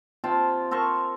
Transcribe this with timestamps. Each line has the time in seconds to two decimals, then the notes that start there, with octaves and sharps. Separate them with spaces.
0.24 C3 F4 G5 A5
0.71 A4 A#4 C5 C#6